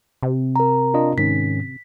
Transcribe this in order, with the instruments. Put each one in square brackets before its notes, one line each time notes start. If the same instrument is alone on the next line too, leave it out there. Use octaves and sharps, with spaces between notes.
[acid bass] C3
[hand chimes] A#4 A#5
[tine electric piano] D4 F4 D#5
[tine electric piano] G#2 D#3 C#4 [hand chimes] B6